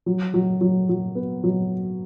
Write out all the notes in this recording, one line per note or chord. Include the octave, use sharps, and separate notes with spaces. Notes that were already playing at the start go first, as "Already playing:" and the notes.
F#3
F#3
F#3
F#3
B3
F#3